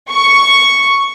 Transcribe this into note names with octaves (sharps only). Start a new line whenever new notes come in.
C#6